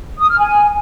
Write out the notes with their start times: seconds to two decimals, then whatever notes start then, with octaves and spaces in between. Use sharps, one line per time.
0.20 D#6
0.29 F6
0.38 G#5